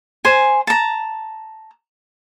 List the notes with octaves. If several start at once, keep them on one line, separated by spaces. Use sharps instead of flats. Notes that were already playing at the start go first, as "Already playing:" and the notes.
C5 G#5
A5 A#5